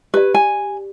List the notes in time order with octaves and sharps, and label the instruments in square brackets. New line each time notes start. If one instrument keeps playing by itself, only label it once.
[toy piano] G4 D5 [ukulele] B4
[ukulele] G#5